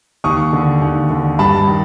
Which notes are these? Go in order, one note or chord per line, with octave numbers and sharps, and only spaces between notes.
D#2 C#6 D#6
D3
D#2
D3
G2 A5 B5
D#3